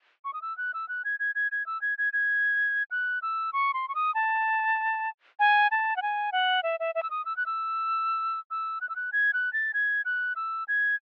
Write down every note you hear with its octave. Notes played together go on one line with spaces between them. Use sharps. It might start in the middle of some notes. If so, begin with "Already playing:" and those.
C#6
D#6
E6
F#6
E6
F#6
G#6
G#6
G#6
G#6
E6
G#6
G#6
G#6
F#6
E6
C#6
C6
C#6
D#6
A5
G#5
A5
F#5
G#5
F#5
E5
E5
E5
E6
D#6
E6
F#6
E6
E6
F#6
E6
F#6
G#6
F#6
A6
G#6
F#6
E6
G#6